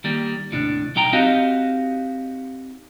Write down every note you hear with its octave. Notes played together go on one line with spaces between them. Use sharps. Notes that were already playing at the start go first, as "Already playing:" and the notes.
D#3 G3 A#3
D#2 A2 C3 D4
B1 F#3 D#4 G5 A#5
C4 D#4 F#4 G4 D#5 F5